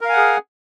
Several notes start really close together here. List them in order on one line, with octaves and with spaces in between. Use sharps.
A#4 F5 G#5 F#5 G#4